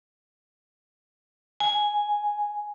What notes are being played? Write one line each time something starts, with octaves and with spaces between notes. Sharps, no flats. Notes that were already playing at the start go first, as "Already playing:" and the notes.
G#5